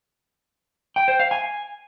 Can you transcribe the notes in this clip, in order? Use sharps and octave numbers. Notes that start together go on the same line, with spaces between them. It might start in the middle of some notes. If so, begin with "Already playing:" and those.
G5
C5
F5
G#5